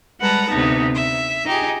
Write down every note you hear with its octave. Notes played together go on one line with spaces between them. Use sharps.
G3 G#3 B4 F#5 A5 A#5
D2 C3 B3 D#4
E5
D#4 F4 G4 G#4